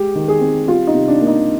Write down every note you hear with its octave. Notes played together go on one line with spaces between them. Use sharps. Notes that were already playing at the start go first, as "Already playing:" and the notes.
Already playing: G#3 G4
D#3
G#4
C4
G3 F4
D#4
C3
D4
A#3
D#4